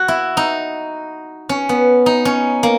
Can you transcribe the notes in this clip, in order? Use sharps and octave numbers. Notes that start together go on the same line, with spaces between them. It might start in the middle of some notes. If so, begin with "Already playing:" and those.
Already playing: F#4
E4
D#4
C#4
B3
D#4
C#4
A#3